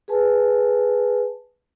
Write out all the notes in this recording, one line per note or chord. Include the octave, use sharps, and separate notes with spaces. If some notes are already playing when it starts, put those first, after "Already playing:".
G#4 B4 G#5 A5